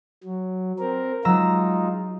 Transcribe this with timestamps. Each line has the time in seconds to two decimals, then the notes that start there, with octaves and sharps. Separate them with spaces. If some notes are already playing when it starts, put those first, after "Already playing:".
0.24 F#3
0.79 C4 A#4
1.25 F#3 G#3 D#4 F4 A#5 E6